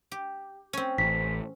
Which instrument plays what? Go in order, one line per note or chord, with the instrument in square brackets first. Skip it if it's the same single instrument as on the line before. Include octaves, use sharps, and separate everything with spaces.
[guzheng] G4
C4 C#4
[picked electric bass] A1 [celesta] B6